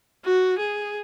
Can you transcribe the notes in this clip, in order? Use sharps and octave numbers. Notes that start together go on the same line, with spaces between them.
F#4
G#4